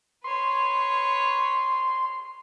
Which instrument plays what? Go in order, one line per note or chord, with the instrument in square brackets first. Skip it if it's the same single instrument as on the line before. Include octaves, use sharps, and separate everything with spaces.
[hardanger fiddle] B4 C#5 [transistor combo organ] C6